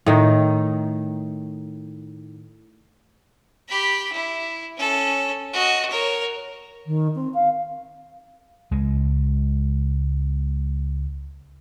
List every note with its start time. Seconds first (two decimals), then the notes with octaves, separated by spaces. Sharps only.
0.06 A2 D#3 D#4
3.69 G4 B5
4.13 E4
4.77 C#4 A4
5.54 F#4 D#5
5.91 A#4 C#5
6.86 D#3
7.15 C4
7.34 F5
8.71 C#2 G#3